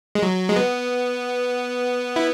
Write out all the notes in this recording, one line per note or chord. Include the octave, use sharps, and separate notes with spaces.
G#3
F#3
G#3
B3
E4